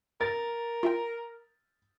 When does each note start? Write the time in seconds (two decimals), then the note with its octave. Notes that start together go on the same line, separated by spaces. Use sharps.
0.21 A#4 A6
0.83 F4 E5 G5